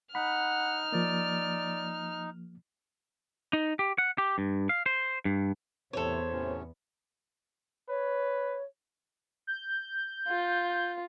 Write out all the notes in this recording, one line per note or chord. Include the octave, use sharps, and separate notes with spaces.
D#4 F#5 B5 F6
F3 A#3 D5
D#4
G4
F#5
G4
G2
F5
C5
G2
E2 A2 C3 B3 A4 C5 C#5
A2 C3 C#4
B4 C#5
G6
F4